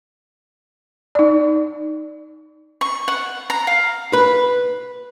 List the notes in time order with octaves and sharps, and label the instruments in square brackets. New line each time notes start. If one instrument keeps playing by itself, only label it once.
[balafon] D#4 D5
[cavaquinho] C#6
F#5
A#5
F5
[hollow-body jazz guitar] B4